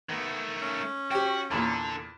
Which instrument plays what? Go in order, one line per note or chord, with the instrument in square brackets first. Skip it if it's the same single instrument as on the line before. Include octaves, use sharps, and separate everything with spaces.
[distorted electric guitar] D#3 A3 [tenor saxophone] B3
[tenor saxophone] C#4
[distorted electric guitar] F#4 [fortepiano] G4 G5
[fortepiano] E2 A#2 [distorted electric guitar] D3 A4